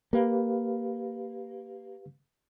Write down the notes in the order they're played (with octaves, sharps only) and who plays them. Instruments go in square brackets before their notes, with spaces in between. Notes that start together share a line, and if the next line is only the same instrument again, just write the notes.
[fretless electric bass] A#3 [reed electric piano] G4 B4 F5